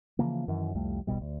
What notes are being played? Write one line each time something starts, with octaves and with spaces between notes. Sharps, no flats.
C#3 E3 F3 A#3
F#2 D#3 E3
C2 F2 G3 A3
D#1 B1 B2 G3
D2